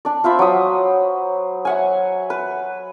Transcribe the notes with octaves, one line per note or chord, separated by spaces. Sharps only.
D4 D5
F4 C5 E5 B5
F#3 D#6
E5 F#5 G#5
B4